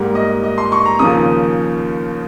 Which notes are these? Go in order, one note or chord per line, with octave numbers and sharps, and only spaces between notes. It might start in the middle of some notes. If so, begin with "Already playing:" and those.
Already playing: G#2 G3 A#3
D#5
D#5
C6
C#6
A#5
D#2 C#3 F3 A#3 C#4 D#6